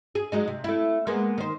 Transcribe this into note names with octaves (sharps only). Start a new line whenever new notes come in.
G#4
F#3 G#3 D#4
C3
A3 E4
G#3 A#3 B3
D#3 C5